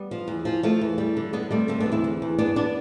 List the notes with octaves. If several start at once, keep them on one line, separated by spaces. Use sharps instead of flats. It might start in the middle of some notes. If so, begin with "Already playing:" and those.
Already playing: G3 B3
F3
E2
F3
F3 A3
E2
G3
D3
D3 G3 B3
G3 A3 C4
D3 A3 C4
B3 D4
E2
C4 E4
E2
E2
G2 B3 D4
B3 D4